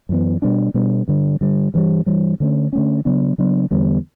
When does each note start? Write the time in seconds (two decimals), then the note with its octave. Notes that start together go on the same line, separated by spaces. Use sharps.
0.09 F#2 E3 B3
0.42 B2 G3 B3 D4
0.74 B2 G3 B3 D4
1.08 G2 D3 G3
1.41 G2 D3 G3
1.74 G2 E3 G3
2.06 G2 E3 G3
2.40 D3 A3 C#4
2.73 D3 A3 C#4
3.05 C#3 F#3 B3 D4
3.38 C#3 F#3 B3 D4
3.71 E2 D3 G3 B3